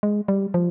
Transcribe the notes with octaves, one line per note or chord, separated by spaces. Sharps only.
G#3
G3
F3